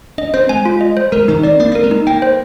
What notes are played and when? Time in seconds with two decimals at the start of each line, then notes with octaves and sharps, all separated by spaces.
0.18 D4 D#5
0.34 C4 C5
0.49 G#3 G#5
0.65 F4
0.81 D#5
0.97 C5
1.12 G#3 A#4
1.28 D#3 D#4
1.43 C4 D5
1.59 A#3 D4
1.72 C4
1.75 A#4
1.83 G#3
1.91 D#4
2.07 A#3 G5
2.22 C5